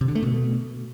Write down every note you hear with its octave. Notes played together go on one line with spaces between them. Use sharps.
C3
D3
A3
B2